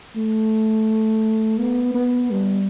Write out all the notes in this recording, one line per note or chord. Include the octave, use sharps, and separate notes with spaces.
A3
B3
B3
G3